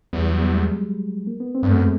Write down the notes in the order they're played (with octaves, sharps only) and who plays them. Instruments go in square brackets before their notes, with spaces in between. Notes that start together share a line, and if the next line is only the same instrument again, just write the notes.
[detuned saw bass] E2 [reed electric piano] G3
[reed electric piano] F#3
G3
G#3
A#3
B3
C4
[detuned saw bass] G2
[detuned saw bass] F#2 [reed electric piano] A3
[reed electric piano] G#3